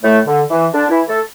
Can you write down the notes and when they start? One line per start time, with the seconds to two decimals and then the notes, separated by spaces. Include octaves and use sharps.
0.03 A2 A3
0.27 D3
0.50 E3
0.73 D3 D4
0.90 E3 E4
1.08 A3 A4